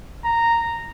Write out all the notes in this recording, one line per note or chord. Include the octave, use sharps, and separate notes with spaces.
A#5